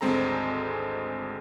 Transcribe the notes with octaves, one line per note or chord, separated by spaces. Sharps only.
G#1 D2 G#3 C4 A4 A#5